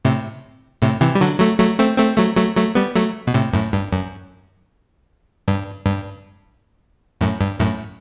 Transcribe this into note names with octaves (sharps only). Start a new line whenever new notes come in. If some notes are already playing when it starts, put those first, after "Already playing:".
A2 C3
A2 C3
C3 E3
G3
D3 F#3
F#3 A3
F#3 A3
A3 C4
A3 C4
F#3 A3
F#3 A3
F#3 A3
G3 B3
F#3 A3
B2
A2 C3
F#2 A2
G2
F#2
G2
G2
F#2 A2
G2
F#2 A2